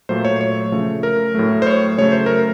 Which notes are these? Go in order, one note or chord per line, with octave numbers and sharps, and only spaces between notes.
A#2 F#3 A3 C5
C#5
C#5
C#3 F3 A3
A#4
A2 F#3 A3
C5
C#5
C#3 F#3 A3 C#5
C5
A#4